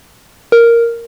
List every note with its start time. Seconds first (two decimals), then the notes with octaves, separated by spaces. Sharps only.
0.52 A#4